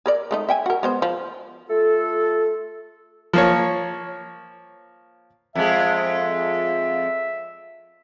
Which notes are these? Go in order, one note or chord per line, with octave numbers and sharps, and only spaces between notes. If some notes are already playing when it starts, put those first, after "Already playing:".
G#4 A#4 D5
G#3 A3 D#4
E5 G5 G#5
F#4 A#4
G#3 B3 C5
F3
A3 F4 A4
F3 A#3 C#5
F2 G#3 E5